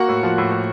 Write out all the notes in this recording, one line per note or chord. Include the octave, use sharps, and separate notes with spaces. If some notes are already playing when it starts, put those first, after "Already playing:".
Already playing: A#3 F#4 F#5
A2
F3
A2
A2